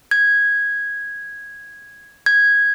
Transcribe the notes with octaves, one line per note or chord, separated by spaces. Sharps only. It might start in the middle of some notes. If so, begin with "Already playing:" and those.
G#6
G#6